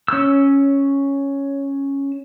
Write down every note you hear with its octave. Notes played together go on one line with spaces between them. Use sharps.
C#4 E6